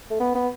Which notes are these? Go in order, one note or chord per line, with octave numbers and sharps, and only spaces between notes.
A3
B3
B3